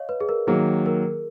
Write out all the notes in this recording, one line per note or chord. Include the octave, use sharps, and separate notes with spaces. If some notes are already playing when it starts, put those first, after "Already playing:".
Already playing: C#5 D#5 F5
B4
G#4
A#4
D#3 F#3 A#3 G#4
A#4